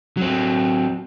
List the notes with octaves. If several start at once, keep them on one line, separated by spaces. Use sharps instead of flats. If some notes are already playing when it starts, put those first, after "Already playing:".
F#3 C4